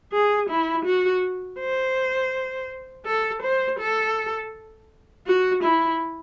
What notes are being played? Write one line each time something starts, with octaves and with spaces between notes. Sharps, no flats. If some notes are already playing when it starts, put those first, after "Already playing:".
G#4
E4
F#4
C5
A4
C5
A4
F#4
E4